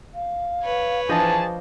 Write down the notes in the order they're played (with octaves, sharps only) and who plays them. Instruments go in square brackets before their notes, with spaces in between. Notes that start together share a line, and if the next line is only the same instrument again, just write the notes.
[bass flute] F5
[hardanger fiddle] B4 C#5
[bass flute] E3 [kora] F3 D4 D#5 [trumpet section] G#4 A5